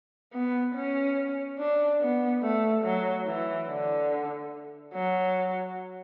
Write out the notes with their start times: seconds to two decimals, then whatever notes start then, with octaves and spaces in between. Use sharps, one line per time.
0.33 B3
0.75 C#4
1.59 D4
2.01 B3
2.42 A3
2.84 F#3
3.26 E3
3.68 D3
4.94 F#3